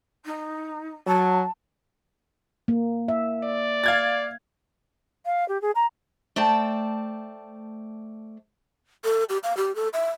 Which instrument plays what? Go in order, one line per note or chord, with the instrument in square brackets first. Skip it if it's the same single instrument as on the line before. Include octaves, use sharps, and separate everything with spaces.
[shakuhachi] D#4
[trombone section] F#3 [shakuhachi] A5
[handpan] A#3
E5
[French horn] D5
[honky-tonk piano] F5 G#6 A6
[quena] F5
G4
G#4
A#5
[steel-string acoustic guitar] A3 C5 D5 G5 A5
[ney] A4
G4
F5
G4
A4
E5